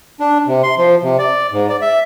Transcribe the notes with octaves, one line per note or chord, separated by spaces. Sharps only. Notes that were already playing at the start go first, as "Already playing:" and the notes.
D4
C3
C6
F3
C3
D5
G#2
D5
E5